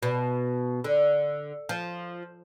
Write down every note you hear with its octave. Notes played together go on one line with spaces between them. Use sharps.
B2
D3
F3